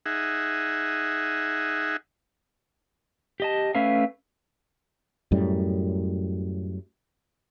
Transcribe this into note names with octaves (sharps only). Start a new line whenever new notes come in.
D#4 G#4 E5 F#5
G4 D#5 A5
A3 C#4 B4 E5 F5
F#2 A2 G3